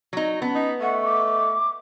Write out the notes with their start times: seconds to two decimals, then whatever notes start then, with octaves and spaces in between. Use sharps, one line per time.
0.13 F#3 D#4
0.42 B3 C#4 A5
0.55 D#4 B4
0.80 A3 D#5 F#5 C#6
1.03 D6